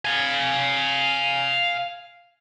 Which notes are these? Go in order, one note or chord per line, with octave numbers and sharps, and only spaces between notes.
F5 G#5